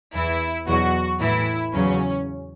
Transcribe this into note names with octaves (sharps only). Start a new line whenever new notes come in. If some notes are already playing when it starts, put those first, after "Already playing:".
E2 E3 E4
E2 B2 F#3 F#4
A2 E3 E4
E2 C#3 F#3 C#4